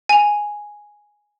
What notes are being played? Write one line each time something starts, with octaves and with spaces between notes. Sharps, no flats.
G#5 F7